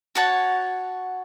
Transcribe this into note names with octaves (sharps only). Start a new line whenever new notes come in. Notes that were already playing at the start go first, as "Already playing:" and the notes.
F#4 C#5 F#5 A5